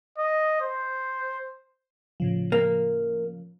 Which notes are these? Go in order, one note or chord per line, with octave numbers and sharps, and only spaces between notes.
D#5
C5
A2 C#3 F3
A#3